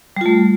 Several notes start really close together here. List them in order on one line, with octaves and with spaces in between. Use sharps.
G3 F4 A3